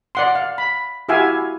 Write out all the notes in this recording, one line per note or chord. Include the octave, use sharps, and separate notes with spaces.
D5 F#5 C6
F5
B5
E4 F#4 G4 E5 F5 G#5